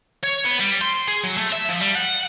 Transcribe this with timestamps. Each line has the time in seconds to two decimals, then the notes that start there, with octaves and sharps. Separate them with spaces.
0.23 C#5
0.44 B3
0.60 G3
0.81 C6
1.08 G#4
1.23 F#3
1.37 A3
1.53 E5
1.69 F3
1.81 G3
1.95 F#5